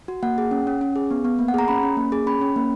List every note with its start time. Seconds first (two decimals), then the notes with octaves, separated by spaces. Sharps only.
0.08 F#4
0.23 A#3 F#5
0.38 G#4
0.51 C#4
0.67 C#4
0.81 C#4
0.96 G#4
1.11 B3
1.25 B3
1.39 A#3
1.48 F#5
1.54 G#4 A#5
1.68 C#4 B5
1.83 C#4
1.97 A#3
2.12 G#4
2.27 C#4 B5
2.41 C#4
2.56 A#3